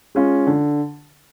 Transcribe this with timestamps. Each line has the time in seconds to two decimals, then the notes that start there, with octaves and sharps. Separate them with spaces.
0.15 G#3 C#4 F4
0.47 D3